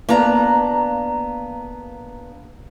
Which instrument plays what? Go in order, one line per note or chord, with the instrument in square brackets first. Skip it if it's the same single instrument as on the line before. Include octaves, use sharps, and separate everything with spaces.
[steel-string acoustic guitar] A#3 B3 D4 A#5